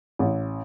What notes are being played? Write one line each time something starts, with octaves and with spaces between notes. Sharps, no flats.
A1